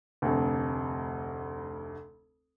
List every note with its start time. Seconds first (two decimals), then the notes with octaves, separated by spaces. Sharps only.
0.22 F1 D2